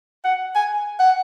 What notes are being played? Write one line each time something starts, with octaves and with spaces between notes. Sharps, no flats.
F#5
G#5
F#5